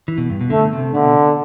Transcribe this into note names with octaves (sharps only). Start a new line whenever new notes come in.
E3
B2
G2
B2
D3 A3
C3
B2 D3